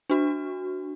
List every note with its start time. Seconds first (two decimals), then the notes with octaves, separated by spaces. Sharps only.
0.10 D4 F#4